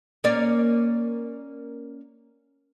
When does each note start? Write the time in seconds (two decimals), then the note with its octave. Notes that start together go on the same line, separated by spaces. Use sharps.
0.24 A#3 C#4 D5